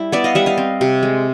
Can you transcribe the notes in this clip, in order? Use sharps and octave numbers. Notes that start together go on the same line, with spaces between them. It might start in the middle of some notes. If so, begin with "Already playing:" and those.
Already playing: G3 E4
B3 D5 E5
D#5 F5
G3 E5 F#5
D#5 F5
C4
C3
G#3